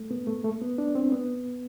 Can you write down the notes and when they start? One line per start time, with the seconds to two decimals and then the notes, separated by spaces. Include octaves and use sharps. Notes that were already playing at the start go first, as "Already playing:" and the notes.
Already playing: A3
0.11 B3
0.27 A3
0.44 A3
0.62 B3
0.78 D4
0.95 C4
1.12 B3